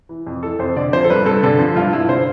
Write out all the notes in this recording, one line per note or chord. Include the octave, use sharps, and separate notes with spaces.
E3
F2
E3 A4
F2 C5
D3 D5
F3 C5
A4
G2 B4
G2 A4
D3 A4
F3
G2 F4
G2 E4
D3 C5